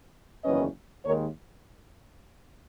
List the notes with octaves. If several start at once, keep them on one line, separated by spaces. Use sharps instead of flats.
F#1 E2 D#3 F#3 C#4 B4 D#5
D#2 D#3 G#3 A#4 C#5